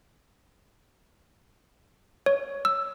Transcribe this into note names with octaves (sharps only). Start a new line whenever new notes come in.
C#5
E6